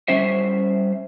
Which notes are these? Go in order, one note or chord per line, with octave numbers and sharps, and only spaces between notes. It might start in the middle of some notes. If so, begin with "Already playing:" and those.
G3 C#4 C5 E5